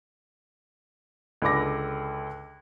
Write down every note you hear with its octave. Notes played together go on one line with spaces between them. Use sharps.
C#2 D3 B5 D6 A#6